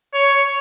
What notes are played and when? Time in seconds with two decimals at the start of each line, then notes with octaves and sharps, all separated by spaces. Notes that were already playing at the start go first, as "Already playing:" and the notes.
0.14 C#5